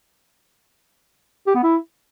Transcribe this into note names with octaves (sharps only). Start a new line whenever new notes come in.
G4
B3
E4